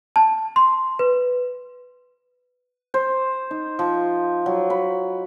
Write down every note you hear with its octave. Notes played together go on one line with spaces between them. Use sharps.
A5
C6
B4
C5
D#4
F3
F#3
B5